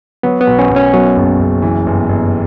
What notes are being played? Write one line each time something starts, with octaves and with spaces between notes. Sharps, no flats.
F#3 B3
B3
B1
C#4
B1
C#4
B2 F#3
F#1
F#1
E3
G1
G1